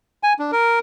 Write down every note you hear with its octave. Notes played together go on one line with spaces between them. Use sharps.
G#5
D4
A#4